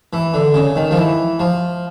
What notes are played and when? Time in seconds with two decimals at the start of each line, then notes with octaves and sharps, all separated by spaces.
0.13 E3
0.34 D3
0.54 C#3
0.76 D#3
0.91 F3
0.97 E3
1.40 F3